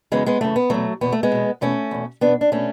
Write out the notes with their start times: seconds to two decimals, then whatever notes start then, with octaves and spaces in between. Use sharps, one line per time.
0.12 F#2 C#3 E3 G#3 B3
0.26 G#3 B3
0.41 F#2 C#3 E3 A3
0.56 B3
0.70 E2 B2 F#3 A3
1.01 E2 B2 B3
1.12 A3
1.23 G#3 B3
1.32 E2 B2
1.61 E2 B2 A3 C#4
1.91 E2 B2
2.21 E2 B2 B3 D4
2.41 D4
2.52 B2 A3 C#4